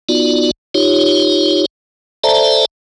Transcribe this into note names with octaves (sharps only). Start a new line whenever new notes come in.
B3 D#4 F4 F#4 D5
D#4 F4 G4 C#5
A4 C5 D5 E5 A5 A#5